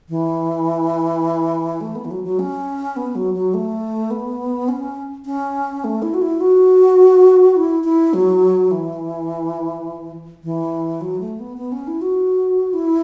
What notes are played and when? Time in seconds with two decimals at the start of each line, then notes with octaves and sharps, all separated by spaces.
0.09 E3
1.81 A3
1.95 B3
2.05 E3
2.11 F#3
2.24 F#3
2.39 C#4
2.96 B3
3.15 F#3
3.34 F#3
3.54 A3
4.10 B3
4.68 C#4
5.25 C#4
5.84 A3
6.02 E4
6.14 F#4
6.22 E4
6.40 F#4
7.56 E4
7.84 E4
8.13 F#3
8.71 E3
10.44 E3
11.01 F#3
11.20 A3
11.39 B3
11.57 B3
11.72 C#4
11.87 E4
12.01 F#4
12.73 E4